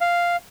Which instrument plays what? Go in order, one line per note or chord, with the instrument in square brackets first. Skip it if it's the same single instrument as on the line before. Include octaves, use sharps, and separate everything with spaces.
[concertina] F5